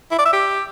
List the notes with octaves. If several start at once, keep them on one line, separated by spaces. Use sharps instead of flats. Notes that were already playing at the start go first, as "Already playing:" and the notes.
E4
D5
E5
G4